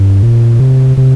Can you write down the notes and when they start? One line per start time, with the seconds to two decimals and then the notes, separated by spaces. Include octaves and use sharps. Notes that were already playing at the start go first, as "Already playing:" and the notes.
Already playing: G2
0.22 A#2
0.60 C3
0.97 C3